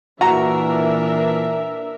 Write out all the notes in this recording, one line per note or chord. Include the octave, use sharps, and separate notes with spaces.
A#2 E3 D4 F#4 A#4 E5 A#5